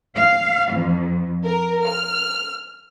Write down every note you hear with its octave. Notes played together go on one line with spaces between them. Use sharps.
F5
F2
A#4
F6